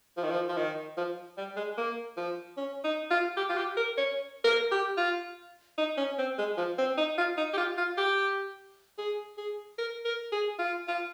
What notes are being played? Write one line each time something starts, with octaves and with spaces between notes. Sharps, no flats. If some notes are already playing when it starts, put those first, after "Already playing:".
F3
D#3
F3
F3
D#3
F3
G3
G#3
A#3
F3
C#4
D#4
F4
G4
F4
G4
A#4
C#5
A#4
G4
F4
D#4
C#4
C4
G#3
F3
C4
D#4
F4
D#4
G4
F4
F4
G4
G#4
G#4
A#4
A#4
G#4
F4
F4